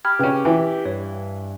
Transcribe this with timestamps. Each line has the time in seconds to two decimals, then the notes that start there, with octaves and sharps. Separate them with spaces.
0.05 G4 B5 F6 G#6
0.19 C#3 C#4 B4 G5
0.45 E3 G5
0.86 G2 C#5